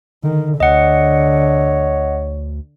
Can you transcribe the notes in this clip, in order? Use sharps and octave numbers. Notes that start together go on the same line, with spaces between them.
D3 D#3
D2 D3 C#5 D#5 F#5